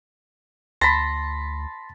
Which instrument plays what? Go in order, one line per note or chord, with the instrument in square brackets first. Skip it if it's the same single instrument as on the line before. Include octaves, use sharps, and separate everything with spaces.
[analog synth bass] D2 [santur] A5 B5 [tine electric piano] C6 A#6